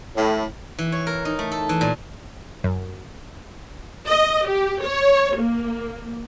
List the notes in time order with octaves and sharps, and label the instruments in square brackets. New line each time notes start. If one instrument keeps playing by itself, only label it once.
[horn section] A2
[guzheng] E3
C#5
A#4
D#4
A3
A4
E3
A#2
[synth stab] F#2
[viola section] D#5
G4
C#5
A#3